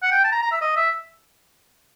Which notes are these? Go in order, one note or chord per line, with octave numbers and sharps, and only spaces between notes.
F#5
G5
A5
A#5
A#5
E5
D#5
E5